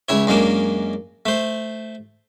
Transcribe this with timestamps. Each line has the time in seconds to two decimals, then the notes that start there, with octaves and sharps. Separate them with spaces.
0.09 C#2 E4 C#5
0.27 F#2 G#3 A#3 D4
1.26 A3 C5